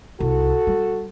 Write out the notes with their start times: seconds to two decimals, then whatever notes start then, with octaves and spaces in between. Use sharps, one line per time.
0.20 C2 F#4 A4
0.67 G3